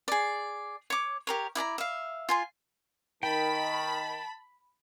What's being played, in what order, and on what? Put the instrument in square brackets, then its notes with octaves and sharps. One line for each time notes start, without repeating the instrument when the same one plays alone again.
[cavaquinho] G#4 D5
C#5 D6
G4 A#4 C#5
E4 D5 A5 A#5
E5 F5
F4 G#5 C6
[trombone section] D#3 [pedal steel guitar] G5 [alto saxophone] A5 [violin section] B5